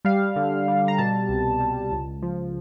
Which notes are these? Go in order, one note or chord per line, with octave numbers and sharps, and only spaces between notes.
G3 F5
D3
G3
A#5
B2 A5
C2
G3
C#2
F3